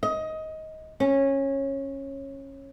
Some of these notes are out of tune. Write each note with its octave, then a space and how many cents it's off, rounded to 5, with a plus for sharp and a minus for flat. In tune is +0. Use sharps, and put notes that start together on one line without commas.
D#5 +20
C#4 -20